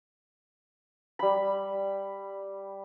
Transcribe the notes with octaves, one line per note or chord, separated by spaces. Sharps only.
G3 B5